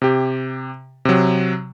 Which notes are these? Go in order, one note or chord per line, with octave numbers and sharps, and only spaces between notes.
C3 G4
C3 F#3